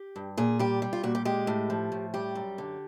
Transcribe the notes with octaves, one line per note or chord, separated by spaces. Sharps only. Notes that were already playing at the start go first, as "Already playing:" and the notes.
Already playing: G4
G2
A#2 G#4
G3 G4
G3
F4
A#2 F#4
G4
G#3 G4
A2
F3
A2
G3 G4
F#2
D3